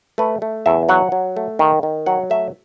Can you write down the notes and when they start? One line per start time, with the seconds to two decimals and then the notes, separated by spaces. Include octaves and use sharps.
0.18 A3 B4
0.42 A3
0.66 E2 E5
0.89 F#3 F#5
1.12 F#3
1.37 A3
1.59 D#3
1.83 D#3
2.06 F#3 F#5
2.30 A3 E5